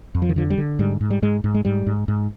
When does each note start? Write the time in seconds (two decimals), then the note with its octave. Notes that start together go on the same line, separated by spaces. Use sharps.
0.15 F2
0.22 F3
0.29 D#3
0.36 D3 F3
0.50 G3
0.58 D3
0.79 G#2 G3
1.01 G#2
1.10 G3
1.22 G#2 G#3
1.44 G#2
1.54 G#3
1.65 G#2 G3
1.87 G#2
2.08 G#2